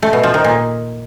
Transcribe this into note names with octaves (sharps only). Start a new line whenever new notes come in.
A3
B2
F3
D#3
A#2